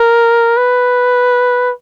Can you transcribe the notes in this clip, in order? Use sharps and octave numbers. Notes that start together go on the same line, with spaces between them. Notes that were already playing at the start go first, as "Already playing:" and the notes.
Already playing: A#4
B4